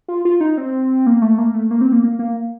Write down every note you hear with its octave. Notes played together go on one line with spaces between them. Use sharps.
F4
F4
D#4
C4
A#3
A3
A#3
A3
A#3
C4
A#3
A#3
A#3